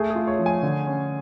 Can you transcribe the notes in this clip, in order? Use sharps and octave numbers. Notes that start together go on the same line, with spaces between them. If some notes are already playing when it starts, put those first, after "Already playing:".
Already playing: A3 G#4
G#4
F4
C#5
F3
G#5
D3
C#4